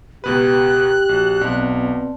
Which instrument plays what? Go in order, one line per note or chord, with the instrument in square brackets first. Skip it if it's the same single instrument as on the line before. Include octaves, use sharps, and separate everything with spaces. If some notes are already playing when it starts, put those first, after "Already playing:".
[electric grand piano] C#2 B2 B4 [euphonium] G4 [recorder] F#6
[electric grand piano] A#1 [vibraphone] F#4
[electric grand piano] B1 [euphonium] B2 [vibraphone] C4 D5 A5